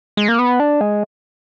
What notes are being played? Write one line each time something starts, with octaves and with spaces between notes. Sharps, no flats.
G#3
A#3
B3
D4
G#3